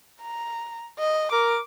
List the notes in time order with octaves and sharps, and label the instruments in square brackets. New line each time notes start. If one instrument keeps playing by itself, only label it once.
[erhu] A#5
D#5
[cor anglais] A#4 [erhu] D6